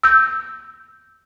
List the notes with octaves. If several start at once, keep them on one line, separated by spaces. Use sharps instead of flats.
E6 G6